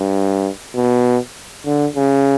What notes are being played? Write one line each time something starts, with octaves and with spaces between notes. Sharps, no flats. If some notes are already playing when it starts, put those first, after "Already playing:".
Already playing: G2
B2
D3
C#3